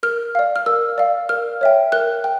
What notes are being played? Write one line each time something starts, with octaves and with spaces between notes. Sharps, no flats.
A#4 F6
D5 F5
F6
A#4 E6
D5 F5
A#4 F6
C#5 E5 G5
A#4 F#6
G5